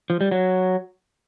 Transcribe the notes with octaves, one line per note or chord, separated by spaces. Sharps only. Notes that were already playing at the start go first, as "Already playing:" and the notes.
F3
G3
F#3